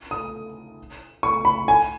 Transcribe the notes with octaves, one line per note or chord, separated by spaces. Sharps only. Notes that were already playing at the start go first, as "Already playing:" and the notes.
D#6
C#6
B5
G#5